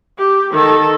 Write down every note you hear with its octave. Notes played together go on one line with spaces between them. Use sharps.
G4
D#3 A4